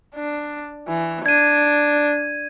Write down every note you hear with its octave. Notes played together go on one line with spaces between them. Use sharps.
D4
E3
D4 G#6 D#7